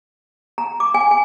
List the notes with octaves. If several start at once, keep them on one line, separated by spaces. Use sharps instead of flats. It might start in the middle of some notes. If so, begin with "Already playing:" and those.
A#5
D6
G#5
G#5